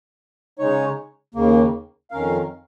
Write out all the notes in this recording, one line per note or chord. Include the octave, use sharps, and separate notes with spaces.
C#3 G#3 D#4 C#5
D#2 C#3 A#3
F2 D#3 C#4 A#4 F5